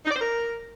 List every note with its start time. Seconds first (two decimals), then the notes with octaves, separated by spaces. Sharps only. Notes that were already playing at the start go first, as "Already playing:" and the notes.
0.05 D#4
0.11 D5
0.16 C5
0.21 A#4